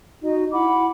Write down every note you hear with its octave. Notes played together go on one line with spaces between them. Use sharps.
D#4 F#4 D#5
E4 F#5 B5 D6